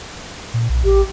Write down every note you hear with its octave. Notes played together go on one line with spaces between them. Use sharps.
A#2
B1
A1 G4